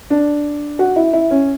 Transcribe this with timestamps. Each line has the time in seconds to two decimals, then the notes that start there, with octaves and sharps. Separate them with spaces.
0.10 D4
0.79 F#4
0.96 E4
1.13 E4
1.31 C#4